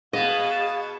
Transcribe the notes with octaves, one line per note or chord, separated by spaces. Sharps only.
B2 B3 G#4 D#5 F5 A5